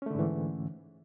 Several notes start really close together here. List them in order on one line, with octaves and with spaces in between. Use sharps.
C#4 A3 D3 G#2 E3